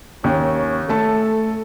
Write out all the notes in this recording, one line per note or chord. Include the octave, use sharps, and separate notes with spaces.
D#2 C#4
A3 A4 A5